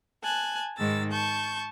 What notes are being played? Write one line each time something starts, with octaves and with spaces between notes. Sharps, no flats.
G#5 A5 F#6
G#2 D#3 G#3 E6 A6
A5 C#6 G6